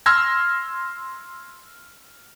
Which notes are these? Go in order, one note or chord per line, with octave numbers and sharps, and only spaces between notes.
C6 E6 F6 G#6 A#6